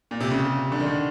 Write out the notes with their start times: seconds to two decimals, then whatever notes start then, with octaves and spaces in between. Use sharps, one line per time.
0.11 A#2
0.20 C3
0.31 C#3
0.72 D3
0.80 D#3
0.87 D3